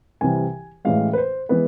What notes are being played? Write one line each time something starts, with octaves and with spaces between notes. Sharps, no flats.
C2 C3 E3 G#5
A1 A2 E3 G#3 F5
B4
C5
E3 G#3 B3 B4